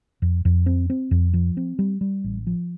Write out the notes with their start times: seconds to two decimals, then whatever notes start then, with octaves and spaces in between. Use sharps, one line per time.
0.22 F2
0.45 F2
0.66 C4
0.90 C4
1.11 F2
1.33 F3
1.57 C4
1.79 G3
2.01 G3
2.24 A1
2.47 F3